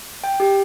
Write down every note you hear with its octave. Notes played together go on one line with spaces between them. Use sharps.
G5
G4